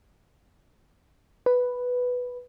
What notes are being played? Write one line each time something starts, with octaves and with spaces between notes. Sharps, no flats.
B4